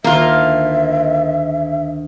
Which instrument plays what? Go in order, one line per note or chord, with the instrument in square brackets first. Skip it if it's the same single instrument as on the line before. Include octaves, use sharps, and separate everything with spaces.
[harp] D2 D#3 [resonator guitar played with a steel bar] A#3 F4 [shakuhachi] E5